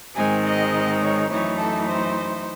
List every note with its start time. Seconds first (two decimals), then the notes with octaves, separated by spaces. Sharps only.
0.15 G#2 D#3 G#3 C4 D#4 G#5
0.44 D#5
1.01 C#5
1.29 F#2 E3 A3 D#4 C#5
1.58 A4
1.86 C5